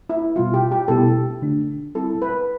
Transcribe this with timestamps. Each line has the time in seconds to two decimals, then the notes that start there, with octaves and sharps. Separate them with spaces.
0.10 E4
0.36 B2 G3 B3 E4 F4
0.54 G4
0.71 G4
0.88 B2 G3 B3 E4 G4 A4
1.42 D3 A3 D4
1.95 G3 C4 E4 A4
2.22 B4